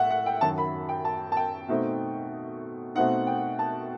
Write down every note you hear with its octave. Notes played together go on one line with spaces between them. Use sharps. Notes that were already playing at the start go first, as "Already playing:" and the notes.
Already playing: A2 E5 F#5
F#5
G5
F#2 D#3 F#3 A5
B5
G5
A5
A5
G5
B2 A3 C4 D#4
B2 A3 C4 D#4 F#5
G5
A5